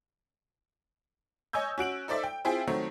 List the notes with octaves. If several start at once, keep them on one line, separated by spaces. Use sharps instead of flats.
C#5 D#5 G#5 C#6 E6 G6
C#4 F#4 D7 F#7
D#4 A4 C5 D5 E5
G5
C4 E4 F4 G#4 E5 G5
D#3 F#3 A3 C4